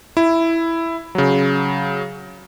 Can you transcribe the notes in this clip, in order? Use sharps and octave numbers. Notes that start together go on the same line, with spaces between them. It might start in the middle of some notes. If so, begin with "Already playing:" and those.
E4
C#3 F#3